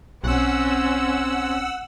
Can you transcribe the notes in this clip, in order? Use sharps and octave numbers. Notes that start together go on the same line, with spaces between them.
B1 C4 C#4 F#5 E6